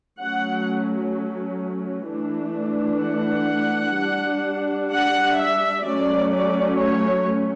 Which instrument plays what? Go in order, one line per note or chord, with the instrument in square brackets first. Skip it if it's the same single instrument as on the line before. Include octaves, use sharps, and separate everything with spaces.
[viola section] F#3 A3 C#4 F#5
E3 A3 D4
F#5
G3 D4
F#5
E5
F#3 A3 C#4 D5
D5
C#5